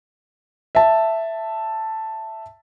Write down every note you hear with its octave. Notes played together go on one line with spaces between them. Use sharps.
E5 A5